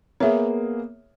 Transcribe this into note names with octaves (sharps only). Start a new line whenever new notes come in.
A#3 B3 G#4 C#5 E5